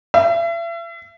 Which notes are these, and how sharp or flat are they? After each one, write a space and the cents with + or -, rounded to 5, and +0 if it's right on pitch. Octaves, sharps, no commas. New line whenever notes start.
E5 +40